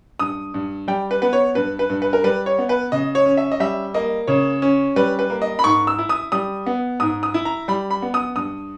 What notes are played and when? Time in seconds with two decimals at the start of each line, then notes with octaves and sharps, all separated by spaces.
0.20 G2 D#6
0.54 G2
0.88 G3 G5
1.11 B4
1.22 B3 B4
1.33 C#5
1.55 G2 B4
1.79 B4
1.90 G2
2.02 B4
2.13 A#4
2.24 G3 B4
2.46 C#5
2.58 B3
2.69 B4
2.92 C#3 D#5
3.15 C#5
3.26 C#4
3.37 E5
3.52 D#5
3.60 G3 E5
3.94 A#3 D#5
4.27 C#3 C#5
4.62 C#4
4.96 G3 B4
5.19 B4
5.30 A#3
5.42 D#5
5.59 B5
5.64 G#2 C#6
5.87 E6
5.99 E4
6.09 D#6
6.32 G3 D#6
6.66 B3
7.00 G#2 D#6
7.23 D#6
7.34 E4
7.45 A#5
7.68 G3 B5
7.91 B5
8.02 B3
8.14 D#6
8.36 G2 D#6